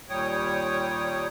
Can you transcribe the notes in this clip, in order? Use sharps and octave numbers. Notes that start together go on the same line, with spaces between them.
D#2 A#2 G3 C#5 G5 D#6